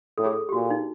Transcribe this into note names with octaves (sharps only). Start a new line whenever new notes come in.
A2 A4
G#4
A4
G4
A#2 F#4
D#4